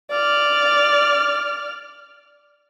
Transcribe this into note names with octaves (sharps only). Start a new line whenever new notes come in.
D5 F6